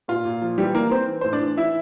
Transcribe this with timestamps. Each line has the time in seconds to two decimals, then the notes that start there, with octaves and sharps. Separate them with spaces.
0.08 A#2 F4
0.25 A#2
0.42 F3
0.58 E3 G3 G4
0.75 E3 A#3 A#4
0.91 E3 C4 C5
1.08 E3
1.21 A2 C5
1.33 D4 D5
1.41 E3
1.57 E3 E4 E5